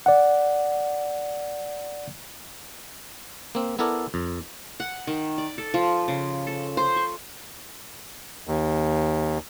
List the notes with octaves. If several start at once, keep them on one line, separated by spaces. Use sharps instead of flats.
D5 F#5
A#3 C4
B3 E4 A4 A#4 D5
F2
F#5
D#3
D5
A4
F3
C#3
A4
C5
C#6
D#2